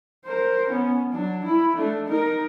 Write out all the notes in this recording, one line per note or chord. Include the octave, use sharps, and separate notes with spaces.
A#4 C5
B3 C#4
F#3 D4
E4 B5
A3 D4
D#4 A#4